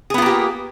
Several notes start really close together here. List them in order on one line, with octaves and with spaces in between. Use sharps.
G#4 B3 F4 A#3 G4